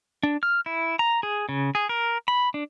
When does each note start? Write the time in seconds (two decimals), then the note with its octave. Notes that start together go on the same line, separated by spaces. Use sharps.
0.23 D4
0.43 F6
0.66 E4
0.99 A#5
1.23 G#4
1.49 C#3
1.75 G#4
1.89 A#4
2.28 B5
2.54 D4